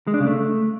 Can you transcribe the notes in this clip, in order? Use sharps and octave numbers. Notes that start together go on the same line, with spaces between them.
G#3
D4
C#3
A3